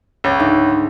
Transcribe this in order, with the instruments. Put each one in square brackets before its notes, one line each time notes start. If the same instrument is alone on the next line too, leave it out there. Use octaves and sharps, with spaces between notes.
[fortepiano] C#2
[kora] G#2 D3 A3